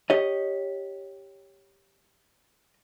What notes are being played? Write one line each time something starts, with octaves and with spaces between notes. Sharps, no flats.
G4 C#5 D#5